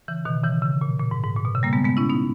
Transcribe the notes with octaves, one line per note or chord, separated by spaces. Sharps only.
C#3 E3
B2 D#3
C#3 E3
C#3
A#2
A#2
G#2
G#2
A#2
B2
C#3
G3 A#3
G#3 B3
G#3 B3
C#4 E4
B3 D#4